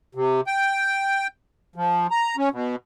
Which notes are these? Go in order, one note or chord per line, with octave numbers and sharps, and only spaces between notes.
C3
G5
F3
A#5
C#4
B2